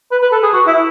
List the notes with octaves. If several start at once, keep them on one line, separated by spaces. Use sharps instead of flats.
B4
B4
A4
G#4
F#4
E4